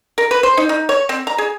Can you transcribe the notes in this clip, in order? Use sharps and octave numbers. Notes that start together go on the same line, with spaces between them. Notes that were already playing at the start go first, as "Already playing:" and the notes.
A#4
B4
C5
D#4
D#4
C#5
C4
A#5
G#4